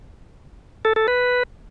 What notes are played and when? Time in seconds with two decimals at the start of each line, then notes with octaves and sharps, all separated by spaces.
0.85 A4
0.96 A4
1.08 B4